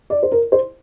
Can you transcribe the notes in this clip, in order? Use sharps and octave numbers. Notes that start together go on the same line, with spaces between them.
D5
C5
A#4
C5